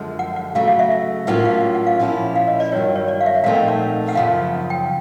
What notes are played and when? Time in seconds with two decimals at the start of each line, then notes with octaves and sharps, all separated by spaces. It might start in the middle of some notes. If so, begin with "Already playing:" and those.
Already playing: F#2 D3 F3 G#3
0.19 F#5
0.36 F#5
0.55 C#3 F#3 A3 F5
0.68 F5
0.79 E5
0.92 E5
1.27 A2 F#3 A#3 C#4 F4 F#5
1.45 F5
1.75 F#5
1.87 F5
1.99 A#2 F3 A#3 C#4 E4
2.36 F5
2.47 D#5
2.60 D5
2.71 G2 D#3 F#3 C#5
2.96 C#5
3.08 D5
3.20 F5
3.26 E5
3.44 A#2 F3 A3 C4 D#4 F5
3.55 F#5
3.68 F#5
4.09 F#5
4.15 F#2 C#3 F3 F5
4.70 G5